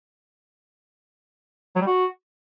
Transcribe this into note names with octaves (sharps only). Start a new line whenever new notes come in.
F#3
G3
F#4